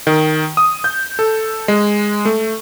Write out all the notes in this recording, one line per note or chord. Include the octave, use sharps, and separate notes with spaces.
D#3
D#6
G6
A4
G#3
A3